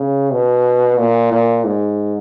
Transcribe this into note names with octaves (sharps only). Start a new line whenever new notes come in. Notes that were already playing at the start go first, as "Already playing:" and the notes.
Already playing: C#3
B2
A#2
A#2
G#2